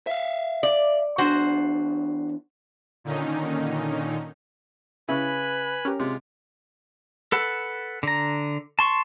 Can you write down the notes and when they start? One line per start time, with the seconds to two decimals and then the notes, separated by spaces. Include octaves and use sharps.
0.07 E5 F5
0.63 D5
1.18 E2 D4 F#4 C5
3.04 A#2 D3 D#3 C#4 D#4
5.09 C#3 C#4 E4 B4 G#5 B5
5.85 C#4 G4 A#4
6.00 C3 G#3 F4
7.32 A4 B4 F#5
8.03 D3 A#5
8.79 A5 C6 C#6